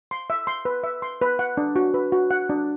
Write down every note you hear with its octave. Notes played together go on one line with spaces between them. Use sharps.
C6
E5
C6
B4
E5
C6
B4
F#5
D4
F#4
B4
F#4
F#5
D4